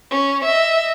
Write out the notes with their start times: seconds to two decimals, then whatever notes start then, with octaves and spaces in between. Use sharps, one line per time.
0.11 C#4
0.45 D#5 E5